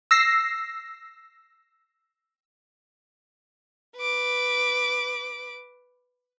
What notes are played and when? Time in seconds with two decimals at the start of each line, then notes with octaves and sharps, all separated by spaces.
0.11 E6 A#6 C7
3.96 B4 D6